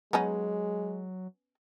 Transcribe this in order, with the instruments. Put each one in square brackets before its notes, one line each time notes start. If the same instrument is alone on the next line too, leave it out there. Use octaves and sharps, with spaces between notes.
[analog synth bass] F#3 [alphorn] G#3 [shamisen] B3 C#4 D#4